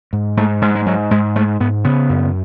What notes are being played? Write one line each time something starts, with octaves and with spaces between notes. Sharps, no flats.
G#2
G#2 A3
G#2 G#3
G#3
G#2 F#3
G#2 G#3
G#2 A3
G#2 B3
C#3 B3
F#2